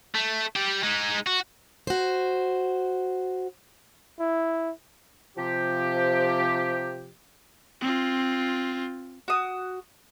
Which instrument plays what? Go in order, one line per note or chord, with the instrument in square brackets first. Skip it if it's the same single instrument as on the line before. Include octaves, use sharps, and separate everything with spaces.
[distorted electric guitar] A3
G3 G4
G#3 D#4
F#4
[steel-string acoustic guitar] F#4 C5
[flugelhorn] E4
[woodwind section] C3 F3 G4
[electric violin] C4 F4
[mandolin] F#4 D#6